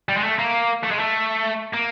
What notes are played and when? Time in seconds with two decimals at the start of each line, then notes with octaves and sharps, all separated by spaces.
0.09 G3
0.17 G#3
0.23 A3
0.38 A#3
0.83 A3
0.91 G#3
0.99 A3
1.73 A#3